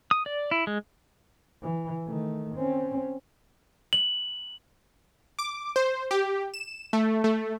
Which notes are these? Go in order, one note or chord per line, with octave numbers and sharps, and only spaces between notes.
D#6
D5
E4
G#3
E3
D#3 A3
C4 C#4
F#7
D6
C5
G4
E7
A3
A3